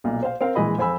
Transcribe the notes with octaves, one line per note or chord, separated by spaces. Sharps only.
B1 A#2
C5 F5
C4 A#4 F5
A#1 E3 G#3 D#5 B5
F2 C4 G#5 B5 E6